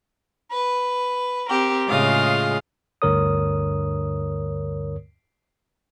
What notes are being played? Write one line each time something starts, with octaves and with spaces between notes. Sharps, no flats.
B4
C4 G4 A#4
A2 C#3 G#3 F4 F5 D#6
D2 G2 D3 A#4 C#5 D#6